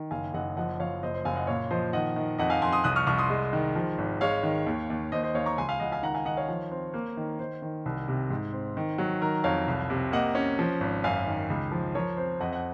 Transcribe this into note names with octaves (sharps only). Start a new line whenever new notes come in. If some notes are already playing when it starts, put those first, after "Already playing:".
Already playing: D#3
F#1 F5 G#5
F#1 D#5 F#5
F3 D#5 F#5
F3 C#5 F5
F#1 C5 D#5
C5
F#1 F5 G#5
D#5 F#5
A#2 C#5 F5
F3 C5 D#5
D#3 D#5 F#5
D#3
F2 D#5 F#5
F5 G#5
F2 G#5 C6
C6 D#6
C2 D#6 F#6
C#6 F6
C2 C#6 F6
C6 D#6
G#3
D#3
F3
G#1
G#3 C#5 F5
D#3
D#2
D#2
D#2 C5 D#5
C5 D#5
D#2 C#5 F5
A#5 C#6
C#2 G#5 C6
F5 G#5
C#2 D#5 F#5
F5 G#5
D#3 F#5 A#5
F5 G#5
D#3 D#5 F#5
C#5 F5
F3
C4
A#3
D#3
D#3 C5
D#3
C2
C3
G#2
C4
D#3
F#3
D#3 A#4
F2 C#5 F5
C2
C3
A#3 D#5 F#5
C#4
F3
G#1
F#2 F5 G#5
D#3
C#2
F3
F3 A#4 C#5
C4 C5
F2 D#5 F#5
F#5